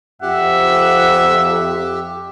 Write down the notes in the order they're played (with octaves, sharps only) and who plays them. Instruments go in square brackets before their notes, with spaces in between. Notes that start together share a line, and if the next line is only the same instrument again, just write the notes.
[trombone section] F2 [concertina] G4 [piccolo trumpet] E5 [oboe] F#5